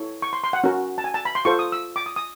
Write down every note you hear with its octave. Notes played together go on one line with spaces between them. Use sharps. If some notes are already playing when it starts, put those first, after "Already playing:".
Already playing: E4 A4 C#5
C#6
C6
C6
F#5
C#4 F#4 A#4
A5
G#5
A5
B5
C6
F4 A4 C5 C#6
D#6
E6
D6
D#6
D#6